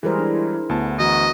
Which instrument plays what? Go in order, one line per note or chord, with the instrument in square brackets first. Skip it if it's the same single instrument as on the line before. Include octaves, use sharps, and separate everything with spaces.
[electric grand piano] E3 G3 G#3 [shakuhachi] E4 [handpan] G#4 A#4 C5
[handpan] D4
[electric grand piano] D2 A5 [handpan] B3
[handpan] E3 F#4 [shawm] D#5 [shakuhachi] A#5